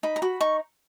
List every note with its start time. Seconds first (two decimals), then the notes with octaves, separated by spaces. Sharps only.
0.03 D#4 B5
0.16 A#5
0.22 F#4 B5
0.41 D#4 C#6